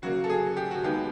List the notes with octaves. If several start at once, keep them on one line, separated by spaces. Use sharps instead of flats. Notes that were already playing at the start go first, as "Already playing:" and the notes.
C#3 F#3 A#3 F#4
A4
G#4
G4
F#4
D#2 D#3 G#3 B3 D#4 G4